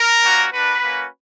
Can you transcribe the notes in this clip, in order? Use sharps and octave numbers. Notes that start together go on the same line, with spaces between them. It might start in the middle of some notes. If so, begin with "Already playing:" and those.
Already playing: A#4
G3 A#3 C#4 F#4
A#3 D4 F#4 B4
A#3 C#4 F#4